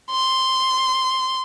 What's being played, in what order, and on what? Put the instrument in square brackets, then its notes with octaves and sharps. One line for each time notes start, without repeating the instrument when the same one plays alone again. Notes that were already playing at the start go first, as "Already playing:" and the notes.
[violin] C6